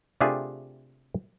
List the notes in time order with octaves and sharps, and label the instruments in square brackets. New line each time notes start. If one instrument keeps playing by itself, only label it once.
[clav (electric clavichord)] C3 A3 D4 F4 G4 G#4